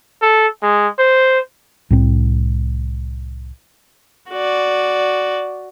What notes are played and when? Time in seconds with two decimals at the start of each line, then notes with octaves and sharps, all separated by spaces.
0.22 A4
0.63 G#3
0.99 C5
1.90 C2 A2 C4
4.30 F#4 D5